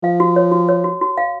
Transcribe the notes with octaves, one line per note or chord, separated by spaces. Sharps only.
F3 F5
F#4
C#5
F#4
C#5
F#4
F#4
F5